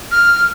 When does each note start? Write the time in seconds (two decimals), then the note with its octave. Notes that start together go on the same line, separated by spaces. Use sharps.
0.12 F6